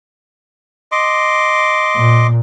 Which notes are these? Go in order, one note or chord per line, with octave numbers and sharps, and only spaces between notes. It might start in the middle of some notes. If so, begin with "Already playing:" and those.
D#5 C6 D6
A#2